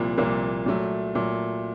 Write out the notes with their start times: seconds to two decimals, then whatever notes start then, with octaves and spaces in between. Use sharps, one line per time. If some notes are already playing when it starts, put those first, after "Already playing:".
Already playing: C2 A#2 F3 A#3
0.18 C2 A#2 F3 A#3
0.66 A#2 F#3 A3
1.15 A#2 F#3 A3